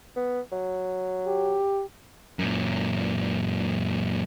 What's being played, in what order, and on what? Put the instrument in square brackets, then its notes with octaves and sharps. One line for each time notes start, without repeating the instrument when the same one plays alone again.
[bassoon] B3
F#3
[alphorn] G4
[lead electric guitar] F#2 A#2